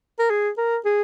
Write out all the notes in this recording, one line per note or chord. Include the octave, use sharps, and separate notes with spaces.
A#4
G#4
A#4
G#4